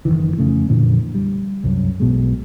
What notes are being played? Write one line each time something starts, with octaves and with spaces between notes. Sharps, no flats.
F#1 C2 D#3 E3
F2 C#3 A3
F2 A#2 D3 E3
G3
C2 F#2
B1 B2 G#3